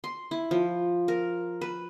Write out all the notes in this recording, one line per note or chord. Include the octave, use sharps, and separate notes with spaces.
C6
E4
F3
A#4
B4